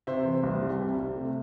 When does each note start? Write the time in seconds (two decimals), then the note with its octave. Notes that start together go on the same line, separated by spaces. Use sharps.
0.07 C3 C5 E5
0.25 E3
0.43 C2
0.62 G3
0.79 C3
0.98 C3
1.16 A3